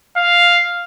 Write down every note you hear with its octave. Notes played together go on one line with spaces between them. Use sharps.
F5